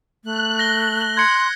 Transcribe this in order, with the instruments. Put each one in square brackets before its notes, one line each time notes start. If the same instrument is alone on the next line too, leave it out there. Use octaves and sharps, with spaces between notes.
[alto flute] A3 [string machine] F#6
[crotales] A#6 G7
[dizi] C6 [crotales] G#6 C#7